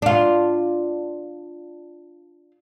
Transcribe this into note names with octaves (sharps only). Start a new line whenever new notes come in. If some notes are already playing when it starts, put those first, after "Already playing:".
D4 F4